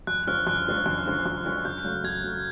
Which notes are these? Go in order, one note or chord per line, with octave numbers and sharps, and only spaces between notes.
F#2 F#6
D3 F3 G#3 C#4 F6
F#2 F#6
D3 F3 G#3 C#4
F#2
D3 F3 G#3 C#4
F#2
D3 F3 G#3 C#4
F#2 G6
C#3 F#3 A3
F#2 G#6
C#3 F#3 A3